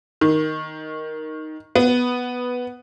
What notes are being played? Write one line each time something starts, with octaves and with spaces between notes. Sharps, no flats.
D#3
B3